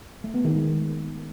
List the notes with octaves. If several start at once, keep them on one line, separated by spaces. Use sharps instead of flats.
A3
B3
D#3
G#3